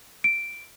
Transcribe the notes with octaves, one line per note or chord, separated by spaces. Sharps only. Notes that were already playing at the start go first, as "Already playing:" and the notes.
D7